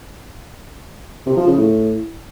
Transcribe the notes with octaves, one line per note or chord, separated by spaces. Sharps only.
C3
F3
C#3
A2